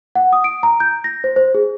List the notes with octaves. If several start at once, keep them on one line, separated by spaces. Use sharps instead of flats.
F#5
D#6
D7
A#5
G6
A#6
C5
C5
G#4